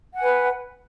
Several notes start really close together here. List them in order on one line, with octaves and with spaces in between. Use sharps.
F#5 G#5 B4